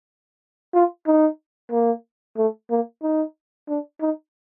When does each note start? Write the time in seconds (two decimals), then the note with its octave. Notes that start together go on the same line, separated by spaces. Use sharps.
0.74 F4
1.07 D#4
1.72 A#3
2.37 A3
2.70 A#3
3.02 D#4
3.68 D4
4.01 D#4